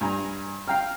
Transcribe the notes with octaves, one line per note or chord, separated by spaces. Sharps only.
G2 G#5 A#5
F5 G5 A#5 F6